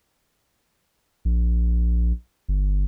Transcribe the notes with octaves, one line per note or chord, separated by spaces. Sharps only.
A#1
G1